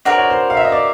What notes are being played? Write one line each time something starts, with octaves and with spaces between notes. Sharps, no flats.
D4 F#4 A#4 C5
C#5
C5
F5
E5
D#5
D5